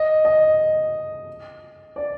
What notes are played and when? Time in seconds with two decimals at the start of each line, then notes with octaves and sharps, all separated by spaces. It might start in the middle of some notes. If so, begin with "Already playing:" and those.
Already playing: D#5
0.25 D#5
1.96 D5